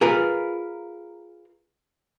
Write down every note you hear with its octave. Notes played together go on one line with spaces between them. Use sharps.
F4 G#4 A#4 B4